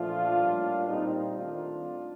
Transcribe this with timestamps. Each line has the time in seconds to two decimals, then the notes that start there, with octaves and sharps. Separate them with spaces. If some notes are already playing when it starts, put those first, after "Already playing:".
Already playing: A#2 F3 A3 D4 F4
0.37 A2 G3 A#3
0.87 A#2 G3 A#3 C4 D#4
1.36 D#3 A3 C4 D4 F4